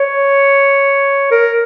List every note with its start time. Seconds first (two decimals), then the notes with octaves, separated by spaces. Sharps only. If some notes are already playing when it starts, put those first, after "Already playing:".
Already playing: C#5
1.31 A#4